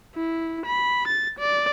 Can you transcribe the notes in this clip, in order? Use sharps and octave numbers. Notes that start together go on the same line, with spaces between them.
E4
B5
A6
D5